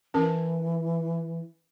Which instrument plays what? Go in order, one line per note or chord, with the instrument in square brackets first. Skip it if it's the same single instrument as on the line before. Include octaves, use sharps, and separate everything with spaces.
[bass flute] E3 [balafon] C#4 A#4 A5